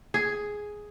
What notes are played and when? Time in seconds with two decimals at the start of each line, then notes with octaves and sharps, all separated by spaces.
0.14 G#4